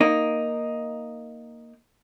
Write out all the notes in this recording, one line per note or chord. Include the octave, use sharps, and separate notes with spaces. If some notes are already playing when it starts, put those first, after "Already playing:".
A#3 D#4